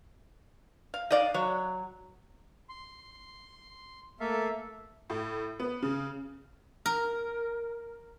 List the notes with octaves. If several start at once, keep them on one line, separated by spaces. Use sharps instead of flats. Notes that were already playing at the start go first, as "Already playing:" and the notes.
F5
D#4 D5 D#5 F5
F#3 C#5
C6
A3 A#3 A4 E5 F5
A2
B3
C#3
A#4